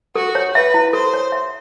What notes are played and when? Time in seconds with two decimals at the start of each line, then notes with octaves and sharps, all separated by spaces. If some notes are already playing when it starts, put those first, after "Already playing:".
0.16 F#4 A4
0.35 C#5
0.54 B4 E5
0.74 E4
0.93 A4 C5
1.13 C#5
1.32 E5